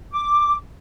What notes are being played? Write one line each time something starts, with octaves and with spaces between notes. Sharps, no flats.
D6